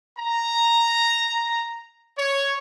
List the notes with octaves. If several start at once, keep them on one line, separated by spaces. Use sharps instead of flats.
A#5
C#5